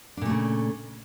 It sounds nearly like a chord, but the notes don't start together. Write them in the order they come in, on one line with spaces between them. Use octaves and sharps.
D4 A#2 A3 C#3